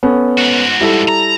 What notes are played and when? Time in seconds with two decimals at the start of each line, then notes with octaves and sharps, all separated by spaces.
0.03 B3 C#4 A4
0.38 G#2 F#4
0.80 G3 E4 A4
1.09 A#5